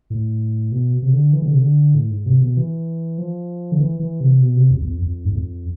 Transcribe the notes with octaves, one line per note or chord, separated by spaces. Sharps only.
A2
B2
C3
D3
E3
D3
C3
D3
A2
G#2
C3
B2
E3
F3
D3
E3
E3
C3
B2
C3
F2
E2
F2
F2
G#2
F2